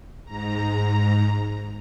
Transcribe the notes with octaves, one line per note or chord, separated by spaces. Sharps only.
G#2 A#5